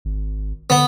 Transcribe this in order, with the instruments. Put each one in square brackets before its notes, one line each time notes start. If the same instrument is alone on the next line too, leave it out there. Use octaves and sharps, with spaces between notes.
[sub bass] G#1
[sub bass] D3 [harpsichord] B3